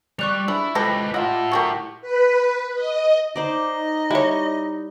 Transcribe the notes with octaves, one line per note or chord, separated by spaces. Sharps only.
G3 D5 C#6 F#6 F7
D4 E4 G#4 B4
E3 F3 G#3 G4 A4 B4 A#6
E4 F4 D#5 F#5 A5 A#5
F#3 G4 G#4 A#4 C#6
B4
D#5
D#4 C5 D5 D#5
G3 E4 C#5